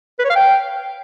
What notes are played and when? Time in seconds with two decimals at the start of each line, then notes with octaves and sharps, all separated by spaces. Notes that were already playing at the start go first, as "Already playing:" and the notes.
0.19 B4
0.24 C#5
0.30 F5
0.35 G5